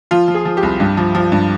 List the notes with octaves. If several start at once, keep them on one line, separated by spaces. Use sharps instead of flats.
F3 F4
F3
G#4
F3
G4
C2
G2
F3
F3
G2